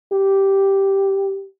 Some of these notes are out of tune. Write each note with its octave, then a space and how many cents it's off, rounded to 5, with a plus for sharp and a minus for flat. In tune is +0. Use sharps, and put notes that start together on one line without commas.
G4 -5